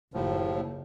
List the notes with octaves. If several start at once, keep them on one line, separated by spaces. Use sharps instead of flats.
F#1 D#2 A2 F3